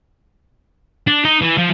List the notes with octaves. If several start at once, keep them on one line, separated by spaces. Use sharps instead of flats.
D4
D#4
E3
F3